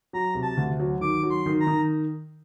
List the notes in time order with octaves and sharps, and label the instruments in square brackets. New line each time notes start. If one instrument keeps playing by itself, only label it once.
[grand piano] F#3 [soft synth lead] A#5
[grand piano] C3
[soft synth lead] A5
[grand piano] D2
F#3
[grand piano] D#3 [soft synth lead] D6
[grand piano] F#3
[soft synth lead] C6
[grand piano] D#3
[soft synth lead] A#5
[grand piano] D#3